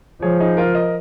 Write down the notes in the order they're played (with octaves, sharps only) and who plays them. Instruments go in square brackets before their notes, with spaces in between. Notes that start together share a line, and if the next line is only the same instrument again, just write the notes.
[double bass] F3 [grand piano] G#4 C#5
[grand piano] D#4 G#4
F4 A#4
A#4 D#5